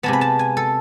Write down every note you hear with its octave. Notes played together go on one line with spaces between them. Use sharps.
C3 G#3 B3 A5
B5
A5
G#5
A4